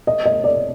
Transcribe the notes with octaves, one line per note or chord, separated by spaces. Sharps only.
D#5
D#5
D5